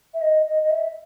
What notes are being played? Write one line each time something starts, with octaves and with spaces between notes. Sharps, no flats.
E5
D#5
D#5
D#5
E5